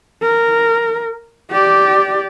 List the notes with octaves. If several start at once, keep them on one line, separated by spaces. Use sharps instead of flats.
A#4
G4 D5